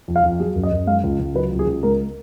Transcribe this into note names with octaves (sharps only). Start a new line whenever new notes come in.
F2
F5
F2
F#3 G#4
F#2
D#5
F#2
G#3 F5
C#2
C#2
F#3 B4
C#2
G#4
C#2
G#3 A#4